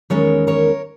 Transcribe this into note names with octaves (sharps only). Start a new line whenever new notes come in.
E2 D#3 G#3 C#4 A#4 C#5
A#4 C#5